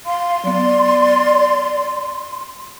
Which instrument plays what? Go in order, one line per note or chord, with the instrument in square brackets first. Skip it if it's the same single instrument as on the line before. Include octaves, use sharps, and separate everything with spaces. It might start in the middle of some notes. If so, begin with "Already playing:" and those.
[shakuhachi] F5 [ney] C6
[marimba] F#3 B3 [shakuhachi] D5